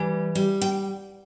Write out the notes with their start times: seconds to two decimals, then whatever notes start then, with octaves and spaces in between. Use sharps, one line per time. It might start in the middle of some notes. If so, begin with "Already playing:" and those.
Already playing: E3 G3
0.35 G3
0.61 G5